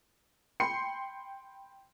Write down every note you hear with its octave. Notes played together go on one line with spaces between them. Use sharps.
G5 B5 C6 C7 C#7